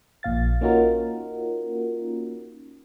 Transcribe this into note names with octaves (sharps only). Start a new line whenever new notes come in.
A#1 A#2 F5 A6
A#3 C#4 D#4 F4 F#4 A#4